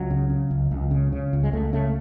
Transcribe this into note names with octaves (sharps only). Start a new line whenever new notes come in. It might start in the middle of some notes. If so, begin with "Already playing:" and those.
Already playing: C#2 F#3
C#3
C#3
C#2
C#2
C#3
C#3
C#2
G#3
C#2 A3
C#3 A3